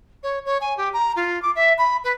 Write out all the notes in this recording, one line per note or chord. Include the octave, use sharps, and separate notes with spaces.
C#5
C#5
G#5
G4
A#5
F4
D6
E5
B5
B4